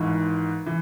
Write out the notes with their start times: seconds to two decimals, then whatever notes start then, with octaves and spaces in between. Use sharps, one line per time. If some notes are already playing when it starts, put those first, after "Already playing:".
Already playing: G#1 G#2 E3
0.66 E3